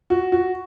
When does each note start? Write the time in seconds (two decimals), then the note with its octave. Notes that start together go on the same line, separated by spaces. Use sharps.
0.10 F#4
0.32 F#4